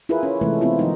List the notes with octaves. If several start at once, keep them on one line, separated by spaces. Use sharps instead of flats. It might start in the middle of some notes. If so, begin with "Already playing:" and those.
E4 F4 G#4 A#4 B4
C#4
C3 E3 G#3 A3 B4
B3 C4 E4 F4
D#3 F3 A3 D#4